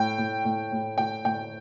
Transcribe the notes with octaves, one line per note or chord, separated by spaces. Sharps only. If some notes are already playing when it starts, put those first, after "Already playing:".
Already playing: A2 G5
A2
A2
A2
A2 G5
A2 G5